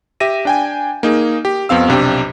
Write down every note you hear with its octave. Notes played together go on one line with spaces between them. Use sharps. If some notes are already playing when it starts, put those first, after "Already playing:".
G4 E5 A#6 D#7
D4 G5 G#5
A#3 D#4 G#4
G4
F2 B3 C4 F5 E6
B1 C3 D4 G4